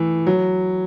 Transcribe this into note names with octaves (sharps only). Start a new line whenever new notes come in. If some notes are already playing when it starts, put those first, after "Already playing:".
Already playing: E3 A3
F#3